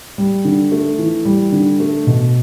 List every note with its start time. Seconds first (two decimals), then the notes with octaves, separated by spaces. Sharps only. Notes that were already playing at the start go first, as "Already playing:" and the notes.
0.18 G3
0.45 D3
0.72 A3
0.99 E3
1.25 G3
1.52 D3
1.80 A3
2.07 B2